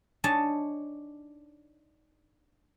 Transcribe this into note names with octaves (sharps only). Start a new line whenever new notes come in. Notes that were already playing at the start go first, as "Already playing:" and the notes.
D4 D#4 C#5 D#5 G#5 A5